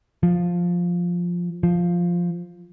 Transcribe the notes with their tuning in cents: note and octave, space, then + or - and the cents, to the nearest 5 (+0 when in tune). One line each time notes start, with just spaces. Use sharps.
F3 +5
F3 +0